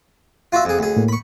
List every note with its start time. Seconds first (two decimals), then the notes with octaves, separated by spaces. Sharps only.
0.52 F4 F#4 E5
0.65 F2 G#4
0.79 D2 G#4
0.97 A2 A#3
1.08 B5 C#6